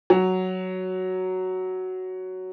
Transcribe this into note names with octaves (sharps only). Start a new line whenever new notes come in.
F#3